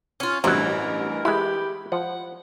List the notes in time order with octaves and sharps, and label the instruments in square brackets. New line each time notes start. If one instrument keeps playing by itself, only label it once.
[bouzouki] C#4 F4
[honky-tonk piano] A1 G2 [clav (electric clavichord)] C3 F#3 [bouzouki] E3 [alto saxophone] A#4
[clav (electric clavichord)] G#3 E4 [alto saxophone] G4 [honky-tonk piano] B5
[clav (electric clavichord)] F3 [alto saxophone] F#5